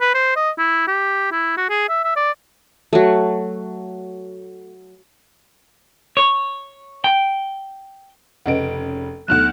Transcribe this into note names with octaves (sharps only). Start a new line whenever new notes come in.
B4
C5
D#5
E4
G4
E4
F#4
G#4
E5
E5
D5
F#3 A3
C#5
G5
F1 C#3 B4 D#5 F#5 D7
D2 F#3 B3 D#4 F6 F#6 E7